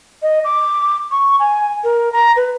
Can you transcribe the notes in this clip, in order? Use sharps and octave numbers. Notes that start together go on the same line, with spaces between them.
D#5
D6
C#6
G#5
A#4
A#5
B4